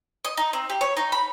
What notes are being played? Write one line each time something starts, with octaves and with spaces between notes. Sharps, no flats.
D#5
D#4
C4
G4
C#5
D#4
B5